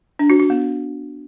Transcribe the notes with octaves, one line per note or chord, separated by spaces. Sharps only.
D4
F#4
F#4
B3